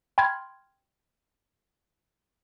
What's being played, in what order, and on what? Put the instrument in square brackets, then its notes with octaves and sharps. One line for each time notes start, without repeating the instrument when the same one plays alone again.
[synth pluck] G5 B5 C6 F6 G#6